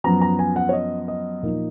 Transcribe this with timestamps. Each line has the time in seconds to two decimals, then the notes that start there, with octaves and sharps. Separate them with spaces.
0.04 F#2 F3 B3 A#5
0.22 A#5
0.39 G#5
0.56 F#5
0.69 C#5
0.73 D#5
1.08 D#5
1.43 A#2 F3 A#3 D#4